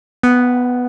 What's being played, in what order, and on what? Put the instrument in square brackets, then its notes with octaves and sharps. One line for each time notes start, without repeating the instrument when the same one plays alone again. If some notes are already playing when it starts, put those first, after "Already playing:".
[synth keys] B3